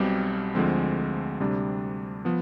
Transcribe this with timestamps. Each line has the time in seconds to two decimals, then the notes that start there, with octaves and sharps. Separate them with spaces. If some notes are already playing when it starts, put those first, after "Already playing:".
Already playing: B1 B2 G3 C4 G4
0.55 D2 D3 F3 G#3 C4
1.40 D2 C3 G3 D4
2.25 F3 B3